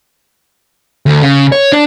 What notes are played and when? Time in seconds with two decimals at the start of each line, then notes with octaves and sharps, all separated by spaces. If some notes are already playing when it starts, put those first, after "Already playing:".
1.06 D2
1.22 C#3
1.52 C#5
1.72 D4